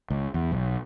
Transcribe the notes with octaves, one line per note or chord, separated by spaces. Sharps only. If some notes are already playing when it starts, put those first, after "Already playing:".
C#2
E2
B1